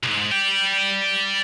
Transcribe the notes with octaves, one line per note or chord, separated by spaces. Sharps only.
C2 G#2
D5 G5